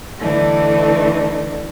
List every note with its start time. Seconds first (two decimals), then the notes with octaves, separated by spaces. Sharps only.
0.18 D3 E3 A3 D4 D#4